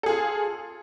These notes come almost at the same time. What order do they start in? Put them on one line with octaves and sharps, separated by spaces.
A4 G#4 F4